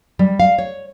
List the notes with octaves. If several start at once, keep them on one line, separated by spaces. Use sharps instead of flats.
G3
F5
C#5